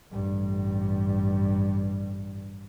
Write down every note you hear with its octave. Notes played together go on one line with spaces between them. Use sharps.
A1 G2